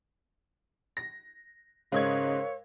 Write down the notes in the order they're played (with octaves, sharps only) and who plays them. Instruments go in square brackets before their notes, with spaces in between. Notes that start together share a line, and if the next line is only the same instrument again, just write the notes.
[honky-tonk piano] A#6
[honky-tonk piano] G#2 D#5 G#6 [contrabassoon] C#3 [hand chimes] A#4 C5 F5 [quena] C#5